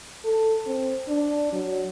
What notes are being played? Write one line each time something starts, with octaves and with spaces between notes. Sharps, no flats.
A4
C4
D4
F#3